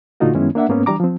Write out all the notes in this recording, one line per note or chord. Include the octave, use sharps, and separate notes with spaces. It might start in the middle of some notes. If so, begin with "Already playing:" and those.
A#2 D3 A3 D#4 F4 F#4
F#2 D#3 G#3 B3 C#4 E4
A#3 D4 E5 F#5
G#2 A#3 B3 C#4
E3 G3 D4 A#5 D6
F3 C4